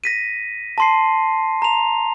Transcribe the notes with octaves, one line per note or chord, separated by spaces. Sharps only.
A#6 B6 D#7
A5 C6 C7
A#5 F7